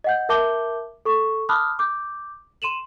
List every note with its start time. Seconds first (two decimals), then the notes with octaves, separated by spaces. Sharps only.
0.04 D#5 F#5 G6
0.29 A#4 E5 A5 D6 G6 G7
1.05 A4 C#6
1.49 A5 B5 D6 D#6 F6 F#6
1.79 D6 G6
2.62 C6 D#7 E7 F#7